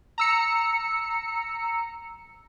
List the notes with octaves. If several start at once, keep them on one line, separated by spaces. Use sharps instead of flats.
A#5 E6 C#7